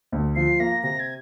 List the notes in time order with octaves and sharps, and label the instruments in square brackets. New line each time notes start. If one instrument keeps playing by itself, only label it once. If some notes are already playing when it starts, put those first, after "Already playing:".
[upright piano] D2
[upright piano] F3 [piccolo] C7
[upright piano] A#3 [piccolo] A#6
[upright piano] C3 [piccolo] A#6
[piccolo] G#6